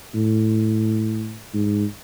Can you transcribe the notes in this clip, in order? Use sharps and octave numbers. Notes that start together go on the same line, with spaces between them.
A2
G#2